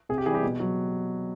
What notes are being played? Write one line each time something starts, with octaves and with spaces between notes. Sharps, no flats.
C3 G#4
G4
E3 G3 G#4
G4
B2
F#3